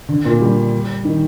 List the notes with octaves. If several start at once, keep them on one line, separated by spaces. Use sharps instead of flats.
D3
A#2
G3
D#3